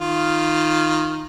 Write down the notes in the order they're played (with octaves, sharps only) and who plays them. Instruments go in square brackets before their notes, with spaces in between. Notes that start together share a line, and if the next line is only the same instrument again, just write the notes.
[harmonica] D#3 F4